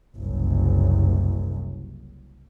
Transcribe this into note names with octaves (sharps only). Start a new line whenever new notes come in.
F#1 C2 F#2